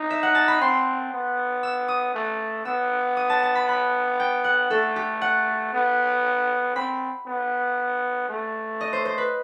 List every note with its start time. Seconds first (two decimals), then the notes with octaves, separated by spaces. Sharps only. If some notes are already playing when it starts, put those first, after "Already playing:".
Already playing: D#4
0.10 E5
0.23 F#5
0.35 A5
0.48 B5
0.61 C4 C6
1.12 B3
1.63 E6
1.88 D#6
2.14 A3
2.65 B3 E6
3.17 D#6
3.29 A5
3.43 A5
3.55 B5
3.69 B5
4.20 G5
4.44 F#5
4.70 A3 A4
4.96 G4
5.21 F#5
5.73 B3
6.75 C4 B5
7.26 B3
8.29 A3
8.81 D#5
8.93 C5
9.05 C5
9.18 B4